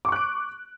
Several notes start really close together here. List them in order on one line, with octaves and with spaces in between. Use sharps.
D6 C#6 F#6 D7